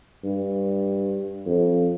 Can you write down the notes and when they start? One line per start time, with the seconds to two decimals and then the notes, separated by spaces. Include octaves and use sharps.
0.24 G2
1.46 F2